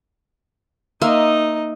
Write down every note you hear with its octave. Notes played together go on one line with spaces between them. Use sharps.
A#3 D#4 D#5 E5 C6